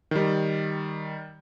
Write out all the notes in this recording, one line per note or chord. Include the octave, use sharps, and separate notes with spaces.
D#3 G3